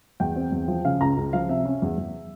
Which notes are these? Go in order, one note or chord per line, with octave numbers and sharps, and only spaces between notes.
E2 G5
C4
E2
F3
C#3 F5
C#2 A#5
C#2
F3 F5
C3 E5
C#4
E2
E2